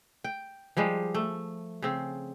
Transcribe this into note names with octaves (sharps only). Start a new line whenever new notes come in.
G5
F3 G3 G#3
A3
C#3 C4